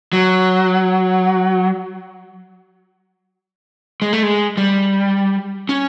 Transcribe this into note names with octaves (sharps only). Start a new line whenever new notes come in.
F#3
G#3
A3
G#3
G3
C#4